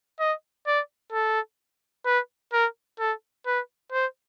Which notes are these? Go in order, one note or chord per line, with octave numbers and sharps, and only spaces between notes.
D#5
D5
A4
B4
A#4
A4
B4
C5